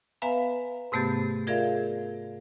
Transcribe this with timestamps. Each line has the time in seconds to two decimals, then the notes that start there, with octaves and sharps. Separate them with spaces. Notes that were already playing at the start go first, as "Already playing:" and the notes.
0.22 B3 B4 E5 F5 G#5 A#5
0.92 G#2 C3 A3 B3 G4 A6
1.47 F4 G#4 A#4 D5 E5 F5